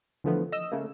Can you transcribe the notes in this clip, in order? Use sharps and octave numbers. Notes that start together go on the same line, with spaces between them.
D3 E3 F3 A3 B3
D#5 E6
C#3 A3 A#3